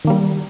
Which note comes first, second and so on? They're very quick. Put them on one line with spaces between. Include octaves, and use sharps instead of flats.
D#3 A#3 G3